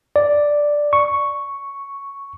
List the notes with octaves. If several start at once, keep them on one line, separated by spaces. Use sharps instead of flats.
D5
C#6